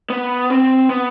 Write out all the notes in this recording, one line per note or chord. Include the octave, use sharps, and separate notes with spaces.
B3
C4
B3